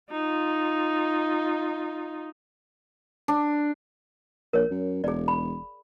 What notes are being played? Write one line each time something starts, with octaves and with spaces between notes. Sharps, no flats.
D#4 F4
D4
A#1 A#4 C#5
F#2
E1 G#4 D5
B5